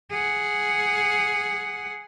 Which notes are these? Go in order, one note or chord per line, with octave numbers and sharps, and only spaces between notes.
G#4 F#5